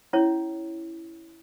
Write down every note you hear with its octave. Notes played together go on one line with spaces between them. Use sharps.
C#4 E4 C#5